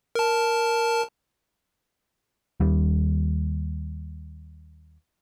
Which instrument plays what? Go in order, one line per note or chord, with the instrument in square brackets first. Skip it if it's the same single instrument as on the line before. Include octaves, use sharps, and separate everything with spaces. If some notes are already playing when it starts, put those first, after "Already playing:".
[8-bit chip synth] A#4 A5
[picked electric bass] D#2 G3